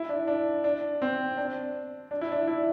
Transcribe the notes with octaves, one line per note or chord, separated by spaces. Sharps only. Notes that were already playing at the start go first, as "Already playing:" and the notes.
Already playing: E4
D4
D4
D4
C4
D4
D4
E4
D4
E4